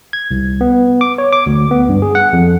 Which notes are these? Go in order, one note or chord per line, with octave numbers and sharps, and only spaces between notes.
G#6
C2
B3
D6
C#5
D6
D2
B3
G2
G#4
F#5
F2